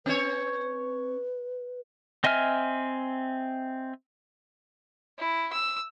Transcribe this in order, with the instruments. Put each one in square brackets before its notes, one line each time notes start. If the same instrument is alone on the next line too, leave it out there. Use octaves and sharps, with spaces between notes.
[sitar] C4 C#5 [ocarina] B4
[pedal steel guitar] C4 D#5 E5 G#5 F6
[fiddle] E4
E6